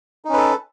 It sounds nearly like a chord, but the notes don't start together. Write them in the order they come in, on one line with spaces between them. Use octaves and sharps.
D#4 C#4 B4 A4